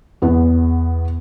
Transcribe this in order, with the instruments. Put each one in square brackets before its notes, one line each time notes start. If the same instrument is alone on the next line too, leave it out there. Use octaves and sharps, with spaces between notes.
[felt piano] E2 B3